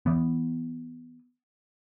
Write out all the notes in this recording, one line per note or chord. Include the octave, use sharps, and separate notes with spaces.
E3 B3